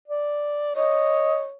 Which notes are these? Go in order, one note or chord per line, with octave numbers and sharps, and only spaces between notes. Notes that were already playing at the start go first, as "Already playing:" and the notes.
D5
C#5 D#5